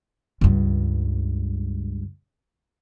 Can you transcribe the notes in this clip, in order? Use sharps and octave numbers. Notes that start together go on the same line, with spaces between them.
C#2 G2